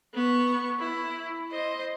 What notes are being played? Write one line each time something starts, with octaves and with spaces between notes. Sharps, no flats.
B3 C#6
E4
C5 D#5